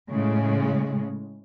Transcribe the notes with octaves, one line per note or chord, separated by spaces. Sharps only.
A2 C#3 G#3